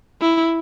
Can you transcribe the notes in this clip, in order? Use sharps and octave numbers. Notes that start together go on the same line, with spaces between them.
E4